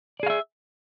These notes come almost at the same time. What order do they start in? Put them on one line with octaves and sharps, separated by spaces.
D5 G#4 F5 E5